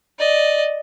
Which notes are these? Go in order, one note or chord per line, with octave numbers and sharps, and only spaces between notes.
D5 D#5